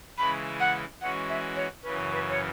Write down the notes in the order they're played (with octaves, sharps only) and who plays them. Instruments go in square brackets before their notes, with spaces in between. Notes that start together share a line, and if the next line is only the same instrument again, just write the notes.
[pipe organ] C#3 E3 G#3 C#4 E4 [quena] B5
[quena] F#5
[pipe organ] E3 G#3 C#4 F#4 [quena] F#5
[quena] E5
C#5
[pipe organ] F#2 C#3 E3 C#4 [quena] B4
[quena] B4
C#5